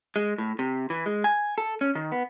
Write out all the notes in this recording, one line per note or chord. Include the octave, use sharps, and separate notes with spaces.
G#3
A2
C3
E3
G#3
G#5
A4
C#4
D#3
B3